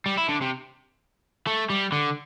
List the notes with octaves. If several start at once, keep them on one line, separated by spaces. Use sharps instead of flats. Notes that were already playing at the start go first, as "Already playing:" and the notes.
G3
E4
D3
C3
A3
G3
D3